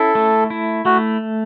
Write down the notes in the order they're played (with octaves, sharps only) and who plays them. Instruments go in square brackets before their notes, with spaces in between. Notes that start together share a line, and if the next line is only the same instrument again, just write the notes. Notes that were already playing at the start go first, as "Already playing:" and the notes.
Already playing: [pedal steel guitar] C#4 E4 [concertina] A4
[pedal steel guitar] A3
E4
[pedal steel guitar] A3 [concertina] F#4